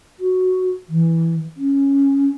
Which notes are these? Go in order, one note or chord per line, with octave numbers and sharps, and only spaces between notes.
F#4
E3
C#4